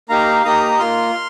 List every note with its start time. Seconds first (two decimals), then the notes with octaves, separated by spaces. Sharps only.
0.09 A#3 D#4 G4 F5 A#5
0.45 A#3 D#4 G4 A#5 D#6
0.79 A#3 F4 C6 F6